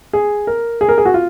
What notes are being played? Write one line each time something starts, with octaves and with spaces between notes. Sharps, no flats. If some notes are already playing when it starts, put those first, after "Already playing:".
G#4
A#4
G#4
A#4
G#4
F#4
F4